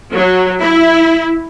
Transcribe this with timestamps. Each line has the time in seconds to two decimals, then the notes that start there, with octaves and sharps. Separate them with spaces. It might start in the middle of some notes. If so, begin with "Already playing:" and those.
0.14 F#3
0.62 E4